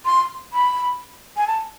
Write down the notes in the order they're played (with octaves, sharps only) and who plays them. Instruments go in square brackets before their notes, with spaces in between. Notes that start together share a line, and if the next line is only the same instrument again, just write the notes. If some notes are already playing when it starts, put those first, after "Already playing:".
[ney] C6
B5
G#5
A5